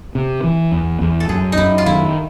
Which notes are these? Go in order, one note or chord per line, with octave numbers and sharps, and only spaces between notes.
C3
E3
E2
E2
A4
F#2 G#4
D#4
F#2 E4
F4
D#3 E4